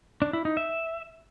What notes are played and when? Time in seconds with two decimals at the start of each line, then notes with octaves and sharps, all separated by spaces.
0.22 D4
0.33 E4
0.45 D#4
0.57 E5